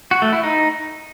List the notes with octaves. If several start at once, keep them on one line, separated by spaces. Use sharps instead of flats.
F#4
A3
E4
D#4